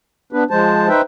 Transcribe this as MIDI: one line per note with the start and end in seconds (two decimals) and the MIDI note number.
0.33 0.44 59
0.33 0.44 62
0.33 0.44 71
0.50 0.88 53
0.50 0.88 56
0.50 0.88 72
0.50 0.88 81
0.89 1.01 63
0.89 1.01 71
0.89 1.01 72
0.89 1.01 76
0.89 1.01 79